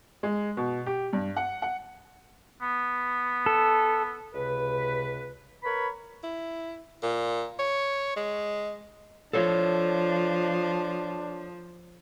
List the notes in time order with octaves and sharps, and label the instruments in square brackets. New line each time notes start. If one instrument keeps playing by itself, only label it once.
[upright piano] G#3
B2
G4
G2
F#5
F#5
[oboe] B3
[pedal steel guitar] A4
[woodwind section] C#2 C3 B4
A#4 B4 C#5 B5
[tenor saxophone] E4
A#2
C#5
G#3
[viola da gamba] F3 [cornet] D4 [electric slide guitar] A4 C#5